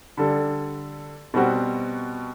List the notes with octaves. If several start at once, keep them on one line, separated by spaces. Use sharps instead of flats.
D3 G3 D4 A4
B2 G3 C4 F#4